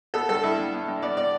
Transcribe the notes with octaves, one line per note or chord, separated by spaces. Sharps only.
B3 A4
G2 A4
G2 E4
G2
B3
G2
B3 D5
B3 D5